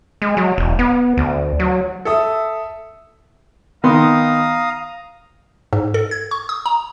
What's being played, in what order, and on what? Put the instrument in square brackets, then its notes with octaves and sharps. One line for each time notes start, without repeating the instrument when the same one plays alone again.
[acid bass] G#3
F#3
E1
B3
D2
F#3
[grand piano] A4 E5 D#6
[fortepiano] D#3 B3 C6 [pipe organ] F5 A#5 D#6
[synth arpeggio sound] G#2
A4
G#6
C#6
D#6
A#5